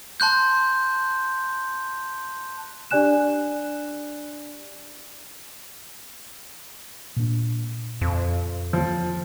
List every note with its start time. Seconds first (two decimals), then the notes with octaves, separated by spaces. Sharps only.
0.20 A5 C6 F#6 G6
2.91 D4 G4 D5 G#5 F#6 E7
7.16 A#2 D4
8.01 F2
8.73 F3